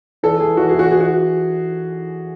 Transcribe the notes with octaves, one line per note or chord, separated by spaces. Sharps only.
E3 A4
E3 G#4
E3 F#4
G#4
E3 F#4
E3 G#4
F#4